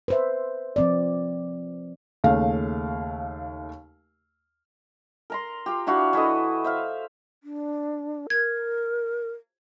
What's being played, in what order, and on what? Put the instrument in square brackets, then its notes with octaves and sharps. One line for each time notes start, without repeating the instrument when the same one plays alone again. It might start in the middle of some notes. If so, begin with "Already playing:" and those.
[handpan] B4 C5 E5
F3 C4 D5
[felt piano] D#2 C#3 A3 F5
[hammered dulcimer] A#4 A#5 C6
F4 G4
D4 E4 F#4 F5
E3 E4 A4 D#5
C5 E5 F5
[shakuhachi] D4
[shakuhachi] A#4 [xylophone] G#6